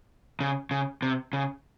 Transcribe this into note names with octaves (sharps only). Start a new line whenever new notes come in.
C#3
C#3
C3
C#3